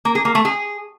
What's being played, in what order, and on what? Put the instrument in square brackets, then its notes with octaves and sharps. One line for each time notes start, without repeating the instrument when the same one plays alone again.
[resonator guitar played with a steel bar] A#3
G#4
A#3
A3
G#4